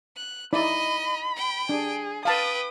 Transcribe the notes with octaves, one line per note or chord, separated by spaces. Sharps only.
F#6
D#4 E4 D5 D#5 B5
G5
D4 G#4
B4 F5 G5 A5 D#6